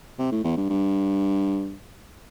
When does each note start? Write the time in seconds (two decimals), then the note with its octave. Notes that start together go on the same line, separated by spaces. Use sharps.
0.19 C3
0.32 A2
0.44 E2
0.57 G2
0.69 G2